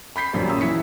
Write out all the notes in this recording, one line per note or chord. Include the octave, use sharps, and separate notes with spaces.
B5 G6 B6 C7
A#1 F#2 D#3 F#3 G3
A#3 C#4 F4 D#6 E6
E3 E4 B6 C#7